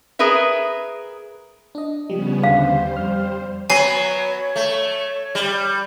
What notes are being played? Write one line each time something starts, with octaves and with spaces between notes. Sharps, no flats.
G#4 A#4 B4 E5
D4 D#5
C#3 F3 G3 B3 C#4
D#2 D3 G3 C5 F5 F#5
F2 F6
F#3 B3 C#5 G#5 C7
A3
G3